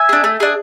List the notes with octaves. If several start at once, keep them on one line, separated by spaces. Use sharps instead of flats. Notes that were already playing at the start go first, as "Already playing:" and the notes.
Already playing: E5 G#5
D4 G#4
A3
D4 G#4